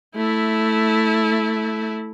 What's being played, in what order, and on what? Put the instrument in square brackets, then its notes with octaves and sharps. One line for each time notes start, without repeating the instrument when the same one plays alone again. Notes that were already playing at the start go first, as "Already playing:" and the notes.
[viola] A3 E4